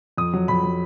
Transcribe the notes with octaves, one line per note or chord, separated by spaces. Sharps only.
F2 D#6
F#3
F2 B5
F#3